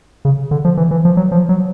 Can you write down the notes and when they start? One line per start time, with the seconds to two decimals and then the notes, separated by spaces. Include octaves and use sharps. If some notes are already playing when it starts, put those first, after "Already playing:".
0.25 C#3
0.51 D3
0.65 F3
0.77 E3
0.91 E3
1.05 F3
1.17 F#3
1.31 F3
1.49 F#3